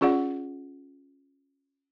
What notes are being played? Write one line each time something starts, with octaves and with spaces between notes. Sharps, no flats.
C#4 F4 G#4 D5 F#5